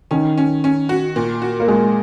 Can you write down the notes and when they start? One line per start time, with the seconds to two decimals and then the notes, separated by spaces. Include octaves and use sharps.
0.11 D#3 C#4
0.37 C#4
0.64 C#4
0.89 F#4
1.16 A#2
1.42 F#4
1.60 A#3
1.68 A#2 G#3